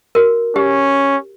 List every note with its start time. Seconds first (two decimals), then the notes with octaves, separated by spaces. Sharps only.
0.15 F#4 A#4
0.56 C#4 G4